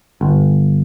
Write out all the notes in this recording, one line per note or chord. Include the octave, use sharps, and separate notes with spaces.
G1